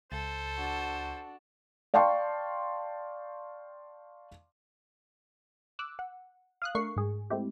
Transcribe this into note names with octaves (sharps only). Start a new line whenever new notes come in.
C#2 A4 C5 A6
D4 F#4
D5 F5 G5 A5 C6 C#6
D6 E6 F#6
F#5
F5 D#6 F#6
A3 D4 A#4 C#6 C7
G#2 G#4
G#3 A3 C4 E4 G4